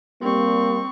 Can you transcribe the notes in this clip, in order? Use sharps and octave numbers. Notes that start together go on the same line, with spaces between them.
G3 A#3 C4 C#6